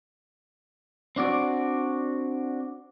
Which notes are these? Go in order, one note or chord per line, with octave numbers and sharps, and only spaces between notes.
C4 D4 F#4 D5